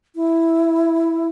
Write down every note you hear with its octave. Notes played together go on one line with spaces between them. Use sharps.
E4